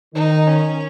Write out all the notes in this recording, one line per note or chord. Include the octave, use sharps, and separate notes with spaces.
D#3 D#4
C#4